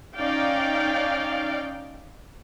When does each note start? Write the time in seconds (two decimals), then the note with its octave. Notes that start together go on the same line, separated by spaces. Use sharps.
0.15 C#4 D#4 D5 F5 G5